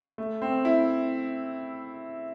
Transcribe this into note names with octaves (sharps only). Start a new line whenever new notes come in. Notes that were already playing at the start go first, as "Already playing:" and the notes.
A3
C4
E4